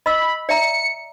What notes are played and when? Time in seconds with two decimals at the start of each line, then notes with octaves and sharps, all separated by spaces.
0.06 D#5 B5 E6
0.49 D5 E5 A#5 C#7